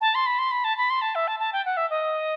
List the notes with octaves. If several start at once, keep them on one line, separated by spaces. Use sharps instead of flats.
A5
C6
B5
C6
B5
A5
B5
C6
A5
E5
A5
A5
G5
F#5
E5
D#5